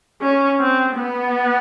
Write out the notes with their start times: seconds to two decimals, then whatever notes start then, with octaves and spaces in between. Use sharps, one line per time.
0.22 C#4
0.60 C4
0.96 B3